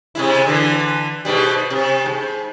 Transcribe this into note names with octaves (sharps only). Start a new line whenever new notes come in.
C3 G#3 E4
D3 E3
G#2 B2 G3
C3
G#2